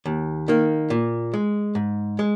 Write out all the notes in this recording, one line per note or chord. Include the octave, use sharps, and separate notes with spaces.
D#2
D#3 A#3
A#2
G#3
G#2
G#3